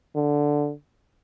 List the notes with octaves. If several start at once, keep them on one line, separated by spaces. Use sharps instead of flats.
D3